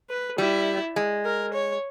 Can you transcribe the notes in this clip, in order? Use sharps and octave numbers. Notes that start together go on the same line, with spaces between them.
B4
G3 E4
G#3
A#4
C#5